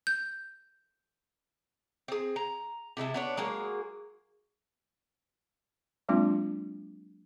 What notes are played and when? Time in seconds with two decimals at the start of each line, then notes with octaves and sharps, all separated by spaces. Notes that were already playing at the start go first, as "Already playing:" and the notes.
0.07 G6
2.08 C4 G#4
2.36 A#5
2.97 C3 G#3 E4 A5
3.14 B3 D4 C#5
3.37 F#3 G#3 A#3 G#4
6.09 F#3 G#3 A#3 C4 D4 F4